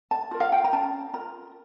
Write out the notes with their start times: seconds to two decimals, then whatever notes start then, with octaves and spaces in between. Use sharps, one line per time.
0.11 A5
0.31 F4 A#4
0.40 F5
0.52 G5
0.64 A#5
0.73 C#4 A5
1.13 F4 A#4 A#5